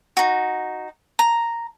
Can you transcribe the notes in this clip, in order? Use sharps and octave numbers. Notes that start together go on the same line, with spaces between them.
D#4 F#4
A#5